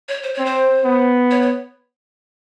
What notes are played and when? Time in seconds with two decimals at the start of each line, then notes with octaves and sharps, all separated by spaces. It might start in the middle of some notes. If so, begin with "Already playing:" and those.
0.08 C#5
0.23 C5
0.34 C4 C#5
0.45 C5
0.85 B3
1.31 C#5
1.42 C#5